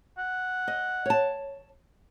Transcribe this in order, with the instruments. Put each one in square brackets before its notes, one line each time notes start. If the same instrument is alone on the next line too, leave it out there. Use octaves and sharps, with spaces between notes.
[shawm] F#5
[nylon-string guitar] D#5
C#5 A5